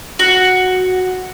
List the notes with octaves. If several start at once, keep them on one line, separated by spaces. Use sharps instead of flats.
F#4